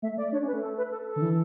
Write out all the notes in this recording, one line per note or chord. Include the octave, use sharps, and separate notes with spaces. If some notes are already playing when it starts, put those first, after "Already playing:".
A3 E5
A3 D5
D4 C#5
C#4
B4
A3
A4
B4
A4
A4
D3
E3